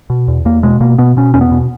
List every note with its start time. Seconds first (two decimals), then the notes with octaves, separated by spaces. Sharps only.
0.10 B2
0.28 E2
0.45 E2 A#3
0.63 B2 G#3
0.80 B2 A#3
0.98 B2 B3
1.17 B2 C#4
1.34 E2 C#4
1.41 B3
1.52 B2